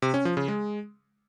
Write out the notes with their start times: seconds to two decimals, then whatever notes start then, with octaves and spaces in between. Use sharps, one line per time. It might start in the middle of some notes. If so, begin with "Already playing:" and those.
0.02 C3
0.14 C#4
0.25 F3
0.37 C#3
0.48 G#3